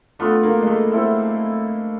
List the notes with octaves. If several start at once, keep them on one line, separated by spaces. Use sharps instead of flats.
A3 B3 D4 F4
A#3
G#3
A3
C4 E4 A4